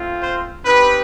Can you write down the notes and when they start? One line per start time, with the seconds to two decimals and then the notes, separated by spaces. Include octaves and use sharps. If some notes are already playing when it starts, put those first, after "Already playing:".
Already playing: A3 C4 F4
0.21 C5
0.65 C4 D#4 G4 B4